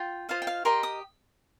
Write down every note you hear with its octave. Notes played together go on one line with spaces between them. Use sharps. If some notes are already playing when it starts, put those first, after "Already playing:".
Already playing: F4 G5
F4 C5 D#5 F5
G5
F5
G4 A#4 D#5 C6
D#6